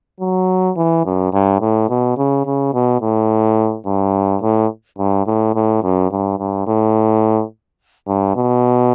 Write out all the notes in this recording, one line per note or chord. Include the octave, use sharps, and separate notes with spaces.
F#3
E3
F#2
G2
A2
B2
C#3
C#3
B2
A2
G2
A2
G2
A2
A2
F#2
G2
G2
A2
G2
B2